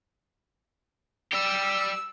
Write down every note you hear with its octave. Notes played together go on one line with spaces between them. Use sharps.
G3 G4 E6